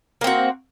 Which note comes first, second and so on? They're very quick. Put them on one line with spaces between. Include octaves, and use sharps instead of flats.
A#3 C4 F#4